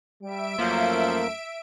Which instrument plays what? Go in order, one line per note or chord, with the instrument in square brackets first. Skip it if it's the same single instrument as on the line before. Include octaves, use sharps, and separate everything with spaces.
[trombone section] G3 [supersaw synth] E5 D7
[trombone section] F#2 A3 [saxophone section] F3 F#3 [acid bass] A#3